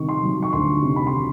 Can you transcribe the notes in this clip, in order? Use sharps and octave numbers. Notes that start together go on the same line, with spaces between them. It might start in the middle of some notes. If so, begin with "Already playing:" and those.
Already playing: C3 D#3 C#6
C6
F#3
C#6
D2 C6
C3
B5
C6
D#3